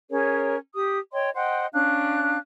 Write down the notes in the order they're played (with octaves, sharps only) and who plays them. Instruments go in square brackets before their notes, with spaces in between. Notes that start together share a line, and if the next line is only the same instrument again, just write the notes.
[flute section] C#4 G#4 A#4 C#5
G4 D#6
C#5 D#5 G5 C6
C5 D#5 F#5 G5
C#4 D4 F5 F#6